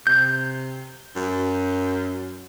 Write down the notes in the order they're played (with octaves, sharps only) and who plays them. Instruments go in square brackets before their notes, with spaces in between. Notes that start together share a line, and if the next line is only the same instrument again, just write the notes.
[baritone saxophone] C3 [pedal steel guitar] G6
[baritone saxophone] F#2